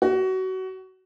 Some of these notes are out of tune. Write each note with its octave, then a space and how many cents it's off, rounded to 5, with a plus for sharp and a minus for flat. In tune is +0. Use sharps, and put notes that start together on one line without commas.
F#4 +25